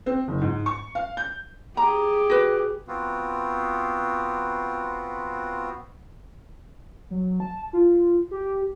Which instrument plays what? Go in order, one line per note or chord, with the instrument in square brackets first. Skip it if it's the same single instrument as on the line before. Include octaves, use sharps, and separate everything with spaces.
[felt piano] C4
F#1
G#2
C#6
F5
G6
[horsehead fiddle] G4 G#4 [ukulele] A#5
[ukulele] F#4 B4
[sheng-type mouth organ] B3 C4 F4 F#4
[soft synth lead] F#3
A5
F4
G4